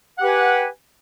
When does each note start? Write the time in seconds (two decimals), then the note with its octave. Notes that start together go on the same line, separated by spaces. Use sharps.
0.17 F#5
0.20 G4
0.23 B4
0.26 G#5